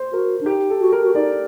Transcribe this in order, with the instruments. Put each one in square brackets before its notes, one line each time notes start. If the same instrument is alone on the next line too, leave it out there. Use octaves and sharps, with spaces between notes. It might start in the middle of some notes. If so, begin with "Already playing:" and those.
Already playing: [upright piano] C5
[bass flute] F#4 [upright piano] A#4
[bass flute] D4
[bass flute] D#4 [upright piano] G4
[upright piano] A4
[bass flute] F#4
[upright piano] A#4
[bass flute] F#4
[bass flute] D#4 [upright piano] D5